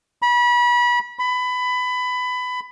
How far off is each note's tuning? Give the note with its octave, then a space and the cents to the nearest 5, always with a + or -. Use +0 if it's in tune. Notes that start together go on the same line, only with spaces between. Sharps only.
B5 -30
B5 +20